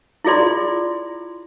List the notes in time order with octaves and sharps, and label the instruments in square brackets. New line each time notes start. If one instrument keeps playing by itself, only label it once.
[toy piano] E4 F4 G#4 D5 C6